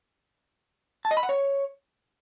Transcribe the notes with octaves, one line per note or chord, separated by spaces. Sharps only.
A5
D#5
B5
F#5
C#5